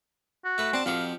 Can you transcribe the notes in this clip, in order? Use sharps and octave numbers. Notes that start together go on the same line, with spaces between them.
F#4
A3 B4
C4 D4 A5
F2 F3 F#4 G4 F5